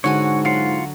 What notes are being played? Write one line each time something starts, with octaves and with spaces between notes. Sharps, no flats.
G#2 D3 F#4 C#5 G#5
F#3 F4 F#5 C6